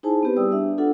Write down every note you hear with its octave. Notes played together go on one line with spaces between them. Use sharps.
D#4 E4 G#4 C5 G#5 A5
B3 C4 G4 B4
G3 G4 D5 G5 D#6 E6
D4 E5
D4 F4 A4 F#5